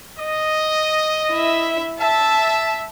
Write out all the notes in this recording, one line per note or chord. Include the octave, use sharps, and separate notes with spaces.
D#5
E4 E5
E5 A5